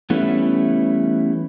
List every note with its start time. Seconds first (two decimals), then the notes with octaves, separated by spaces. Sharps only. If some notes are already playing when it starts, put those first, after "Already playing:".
0.10 E3 G3 A3 B3 C#4 E4